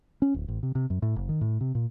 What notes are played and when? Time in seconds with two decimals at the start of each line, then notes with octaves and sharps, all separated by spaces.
0.22 C#4
0.34 D1
0.48 A1
0.63 C3
0.75 C3
0.90 F#2
1.02 A2
1.16 F#1
1.29 D#3
1.41 A2
1.61 C3
1.75 A#2